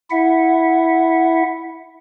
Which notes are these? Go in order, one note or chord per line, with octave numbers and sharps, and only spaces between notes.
E4 E5 F#5